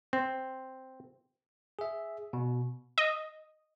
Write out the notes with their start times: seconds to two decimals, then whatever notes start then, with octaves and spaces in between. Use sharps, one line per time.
0.13 C4
1.79 G#4 E5
2.33 B2
2.98 D#5